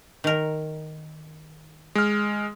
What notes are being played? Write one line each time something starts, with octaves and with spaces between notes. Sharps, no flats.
D#3 A#4
G#3 F6